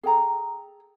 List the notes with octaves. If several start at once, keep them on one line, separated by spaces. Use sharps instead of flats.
G#4 A4 G5 A#5